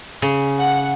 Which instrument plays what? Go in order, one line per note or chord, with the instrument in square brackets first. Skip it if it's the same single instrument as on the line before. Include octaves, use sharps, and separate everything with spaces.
[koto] C#3
[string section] F#5